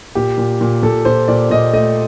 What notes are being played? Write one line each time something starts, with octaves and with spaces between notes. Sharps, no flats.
A#2 G4
A#2
A#2
A#2 A4
A#2 C5
A#2 D5
A#2 D#5
A3 D#5